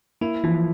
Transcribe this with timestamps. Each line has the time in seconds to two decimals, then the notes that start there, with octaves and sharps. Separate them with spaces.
0.21 A#3 E4
0.44 E3 F3